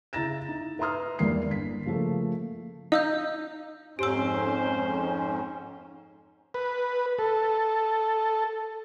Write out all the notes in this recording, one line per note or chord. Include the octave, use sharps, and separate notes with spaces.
C#3 E4 A#5 A6 A#6 E7
D#4
B4 E5 A#5 C6 D#6 F6
E2 G2 A#3 C7
G1 B6
C#3 F3 A3 A#3
D#4 F5 E6 G6
F2 G#2 C#4 G4 C5 E6
B4
A4